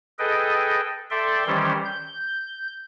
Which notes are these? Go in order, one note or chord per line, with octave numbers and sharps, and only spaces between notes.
G#4 A4 B4 D#5 G5
A4 D5 E5 G5 C6
D#3 E3 G3 C#4 G4 C5
G6